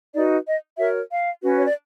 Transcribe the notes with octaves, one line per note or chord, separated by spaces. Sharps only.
D#4 F#4 B4 D5
D#5
F#4 A#4 C#5 E5
F5
C#4 F#4 B4
C#5
D5